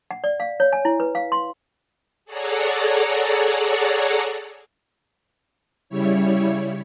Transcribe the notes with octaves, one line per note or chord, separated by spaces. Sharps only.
F#5
D5
F5
C#5
G#5
E4
B4
F5
C6
G#4 A4 C#5 D5 F#5 A#5
C#3 G3 E4 C#5